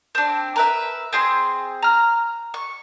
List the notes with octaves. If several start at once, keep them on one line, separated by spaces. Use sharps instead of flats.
C4 D4
A#4 B4 E5
C4 G#4 C6
A#5 F6
C#6